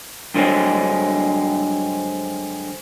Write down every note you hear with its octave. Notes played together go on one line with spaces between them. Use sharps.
G2 D3 F#3 G#3 C4